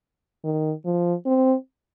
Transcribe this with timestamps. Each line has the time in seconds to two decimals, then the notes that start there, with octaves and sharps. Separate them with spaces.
0.44 D#3
0.85 F3
1.26 C4